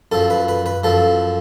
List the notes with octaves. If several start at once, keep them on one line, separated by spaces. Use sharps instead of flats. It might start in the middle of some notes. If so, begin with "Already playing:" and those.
F#2 F3 A4
B4
B4
B4
F#2 F3 A4